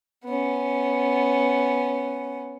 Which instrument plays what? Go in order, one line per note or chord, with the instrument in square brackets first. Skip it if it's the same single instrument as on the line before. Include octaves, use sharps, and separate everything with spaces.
[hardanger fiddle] B3 C#4